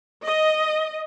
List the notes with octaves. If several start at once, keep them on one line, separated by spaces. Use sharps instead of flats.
D#5